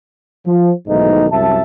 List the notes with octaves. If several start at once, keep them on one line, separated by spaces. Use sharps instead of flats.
F3
B1 G#2 D#3 E3 A3 D#4
C2 F#2 E5 A5